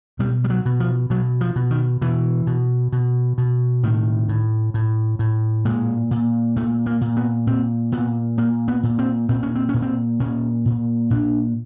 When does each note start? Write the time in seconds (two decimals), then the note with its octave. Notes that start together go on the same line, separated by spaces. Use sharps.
0.19 B2 G3
0.44 G3
0.50 F#3
0.66 B2
0.80 F3
1.10 B2 F#3
1.41 F3
1.56 B2
1.71 D#3
2.01 B2 E3
2.47 B2
2.92 B2
3.38 B2
3.83 A2 D#3
4.29 A2
4.74 A2
5.19 A2
5.65 A#2 G#3
6.11 A#2
6.56 A#2 A3
6.86 A#3
7.01 A#2
7.17 B3
7.47 A#2 C4
7.92 A#2 B3
8.38 A#2 A#3
8.68 B3
8.83 A#2
8.99 C4
9.29 A#2 C4
9.43 C#4
9.55 C4
9.69 C#4
9.74 A#2
9.82 C4
10.20 A#2 C#4
10.66 A#2
11.10 A#2 D4